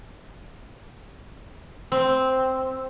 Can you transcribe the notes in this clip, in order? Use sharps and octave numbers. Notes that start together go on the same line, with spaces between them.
C4